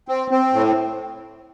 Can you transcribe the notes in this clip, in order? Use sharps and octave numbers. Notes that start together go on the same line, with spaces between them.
C4
C4
A2